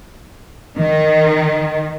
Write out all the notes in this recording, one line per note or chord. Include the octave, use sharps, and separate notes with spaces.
D#3